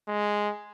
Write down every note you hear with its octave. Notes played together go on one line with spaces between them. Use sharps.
G#3